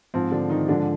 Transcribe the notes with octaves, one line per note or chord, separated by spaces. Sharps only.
G#2 F3 C4
D3 D4
D#3 D#4
G#2 D3 F3 D4